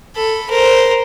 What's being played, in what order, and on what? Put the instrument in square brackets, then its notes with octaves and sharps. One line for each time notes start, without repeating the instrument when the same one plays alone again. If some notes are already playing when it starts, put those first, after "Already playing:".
[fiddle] A4 B5
A#4 C5